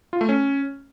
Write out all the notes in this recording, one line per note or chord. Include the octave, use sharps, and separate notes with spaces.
F4
A3
C#4